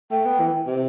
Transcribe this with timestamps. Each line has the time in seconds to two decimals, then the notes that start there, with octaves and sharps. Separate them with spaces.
0.12 A3 G5
0.25 B3
0.40 E3
0.67 C3